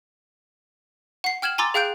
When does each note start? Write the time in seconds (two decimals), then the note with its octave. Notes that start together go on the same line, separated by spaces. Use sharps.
1.24 F#5 C7
1.42 G5 F6 G#6 E7 F#7
1.58 G#5 A#5 C6 D6 E6 A6
1.74 G#4 F5 G5 F#6 G6 D7